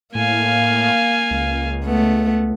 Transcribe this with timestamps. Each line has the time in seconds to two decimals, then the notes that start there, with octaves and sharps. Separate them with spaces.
0.15 A2 A#3 F5 G#5
1.31 C#2
1.86 A3 B3